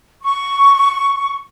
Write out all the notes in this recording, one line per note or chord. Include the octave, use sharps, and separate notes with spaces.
C#6